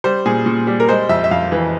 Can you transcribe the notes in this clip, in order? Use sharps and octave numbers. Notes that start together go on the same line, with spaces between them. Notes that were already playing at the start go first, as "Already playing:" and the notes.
G3 C5
A#2 G#4
A#2
G3
A#4
G#3 C5
F2 E5
E5
F2 F5
E3